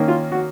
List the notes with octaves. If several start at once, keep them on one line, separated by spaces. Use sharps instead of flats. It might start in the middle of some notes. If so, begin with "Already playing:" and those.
Already playing: D#3 A#3 C#4
F4
F#4